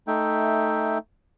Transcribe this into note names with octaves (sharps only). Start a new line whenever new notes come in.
A3 D#4 E5 G5